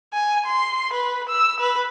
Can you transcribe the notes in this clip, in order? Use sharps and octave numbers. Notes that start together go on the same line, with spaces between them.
G#5
C6
B4
E6
B4